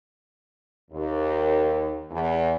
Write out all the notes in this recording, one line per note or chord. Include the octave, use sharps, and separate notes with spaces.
D#2
E2